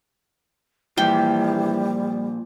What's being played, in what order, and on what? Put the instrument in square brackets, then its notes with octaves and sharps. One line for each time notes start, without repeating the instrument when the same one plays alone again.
[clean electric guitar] A#2 F3 [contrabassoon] E3 [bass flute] G3 [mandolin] G4